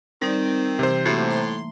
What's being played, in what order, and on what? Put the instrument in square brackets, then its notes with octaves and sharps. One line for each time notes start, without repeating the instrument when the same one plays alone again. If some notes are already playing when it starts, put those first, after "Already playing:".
[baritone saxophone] D#3 [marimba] G3 D#4 D5 [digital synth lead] C4
[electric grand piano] C3 C5 [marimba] E3
[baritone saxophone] A2 [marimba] A3 A#3 E5 [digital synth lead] F#4
[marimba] A#5 [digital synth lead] C6